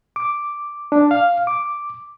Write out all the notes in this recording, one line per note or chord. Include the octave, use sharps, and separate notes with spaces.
D6
D4
F5
D6